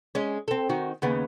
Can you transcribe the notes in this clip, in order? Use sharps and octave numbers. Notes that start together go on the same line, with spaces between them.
G#3 C#4
C4 A4
D#3 D#4 F#4
D#2 C#3 B3